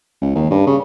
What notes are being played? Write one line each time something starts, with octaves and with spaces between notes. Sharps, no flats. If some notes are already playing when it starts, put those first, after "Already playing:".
C#2
D#2
G2
C#3